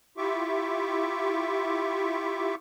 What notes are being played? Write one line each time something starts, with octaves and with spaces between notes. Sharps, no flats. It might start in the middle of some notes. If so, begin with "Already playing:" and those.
E4 F4 G4 E5 C#6 D6